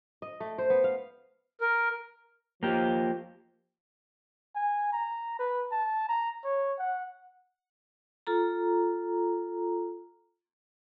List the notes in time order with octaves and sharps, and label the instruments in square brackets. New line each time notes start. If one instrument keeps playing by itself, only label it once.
[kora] D#5
A3
C5
B3
F5
[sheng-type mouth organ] A#4
[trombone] F3 [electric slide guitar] A#3 G4
[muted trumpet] G#5
A#5
B4
A5
A#5
C#5
F#5
[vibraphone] F4 A4 A#5